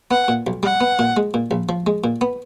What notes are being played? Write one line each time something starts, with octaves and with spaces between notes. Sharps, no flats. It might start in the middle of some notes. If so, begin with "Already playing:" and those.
B3 F#5
A#2
B1
G3 F#5
B3
A#2
G#3
A#2
A#1
F3
G#3
A#2
B3